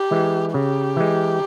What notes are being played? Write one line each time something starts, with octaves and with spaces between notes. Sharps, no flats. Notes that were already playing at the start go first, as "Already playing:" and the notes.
Already playing: G4
E3 G#3
C#3 G4
E3 G#3